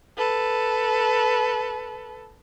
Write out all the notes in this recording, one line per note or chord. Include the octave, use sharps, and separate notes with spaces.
A4 B4